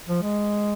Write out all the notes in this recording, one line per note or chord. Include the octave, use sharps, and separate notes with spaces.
F3
G#3